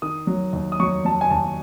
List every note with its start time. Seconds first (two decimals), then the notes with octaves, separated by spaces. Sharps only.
0.02 D#3 D#6
0.27 F#3
0.53 D#2
0.72 D#6
0.80 F#3 C#6
1.05 F#3 A5
1.21 G#5
1.30 D#2 A5